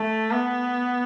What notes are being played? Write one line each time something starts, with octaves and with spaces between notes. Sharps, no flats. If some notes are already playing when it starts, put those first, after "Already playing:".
Already playing: A3
B3